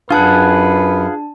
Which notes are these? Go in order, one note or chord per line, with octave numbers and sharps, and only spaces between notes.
F#2 D4 F4 G#4 B4 F#5 A5